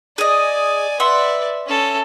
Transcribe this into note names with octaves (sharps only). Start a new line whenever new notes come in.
G#4 D5 D#5 G#5
B4 D5 E5 F#5 C6
C#4 A4